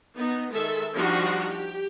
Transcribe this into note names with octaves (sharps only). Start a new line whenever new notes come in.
B3 D#4
D#3 G#3 A4 E5
F3 G3 D4 D#4 F#4 G4
G4